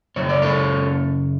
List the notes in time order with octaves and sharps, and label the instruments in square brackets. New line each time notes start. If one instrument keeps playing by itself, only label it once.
[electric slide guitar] F#2 C#3 C#5
D5
A4 C#5